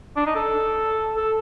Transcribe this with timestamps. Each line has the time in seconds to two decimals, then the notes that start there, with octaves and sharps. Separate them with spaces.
0.16 D4
0.26 D#4
0.35 A4
1.16 A4